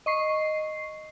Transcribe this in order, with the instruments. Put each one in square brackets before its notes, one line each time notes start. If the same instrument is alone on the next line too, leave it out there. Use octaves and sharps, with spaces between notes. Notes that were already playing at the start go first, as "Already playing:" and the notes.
[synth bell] D#5 C#6 C7